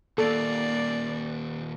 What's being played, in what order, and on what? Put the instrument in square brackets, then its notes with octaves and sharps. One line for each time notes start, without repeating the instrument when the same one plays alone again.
[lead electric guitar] D#2 A#2 [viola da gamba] A#3 D5 [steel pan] A4